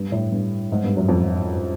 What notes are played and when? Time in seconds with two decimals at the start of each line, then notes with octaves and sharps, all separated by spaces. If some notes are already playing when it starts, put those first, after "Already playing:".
Already playing: G2
0.12 A2
0.32 G2
0.72 G#2
0.84 G2
0.97 F#2
1.09 F2